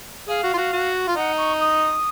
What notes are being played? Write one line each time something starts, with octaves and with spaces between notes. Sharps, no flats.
G#4 F5
F#4
F4
F#4
F#4
F4
D#4 F#5
C#6
D#6